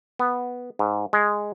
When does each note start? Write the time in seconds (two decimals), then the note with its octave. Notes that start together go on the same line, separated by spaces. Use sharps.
0.19 B3
0.79 G#2
1.13 G#3